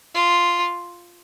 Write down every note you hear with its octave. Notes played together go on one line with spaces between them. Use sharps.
F4